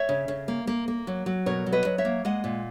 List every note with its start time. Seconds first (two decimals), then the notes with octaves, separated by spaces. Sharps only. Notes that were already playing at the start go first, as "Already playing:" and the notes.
Already playing: C#5 E5
0.09 C#3
0.28 C#3
0.48 A#3
0.67 A#3
0.88 A#3
1.07 F#3
1.26 F#3
1.46 B2 A#4 C#5
1.66 F#3
1.72 B4 D#5
1.85 F#3
1.98 C#5 E5
2.05 A#3
2.25 G#3 D#5 F#5
2.44 A#2